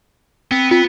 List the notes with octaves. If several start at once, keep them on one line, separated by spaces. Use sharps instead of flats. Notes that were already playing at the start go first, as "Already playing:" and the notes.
B3 C4
B3 F4